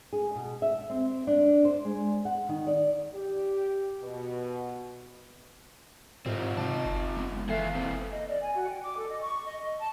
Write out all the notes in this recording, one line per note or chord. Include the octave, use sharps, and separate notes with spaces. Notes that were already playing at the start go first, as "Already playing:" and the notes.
G#4
B2
E5
C4
D4
C5
G#3
F#5
D#3
D5
G4
B2
G#2 C4 D#4 F4 G4 A#4 C5
C3 D#5 A5
F#1
G#3 B3
E3 G#4 A4 B4 E5 F5 C7
B2 E3 A#3 C4
D#5
D5
G#5
F#4
G5
D6
A4
D#5
C#6
D#5
D#5
A5